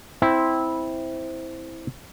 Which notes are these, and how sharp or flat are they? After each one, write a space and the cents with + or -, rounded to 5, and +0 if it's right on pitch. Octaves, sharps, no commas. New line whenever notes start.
C4 +0 E4 -10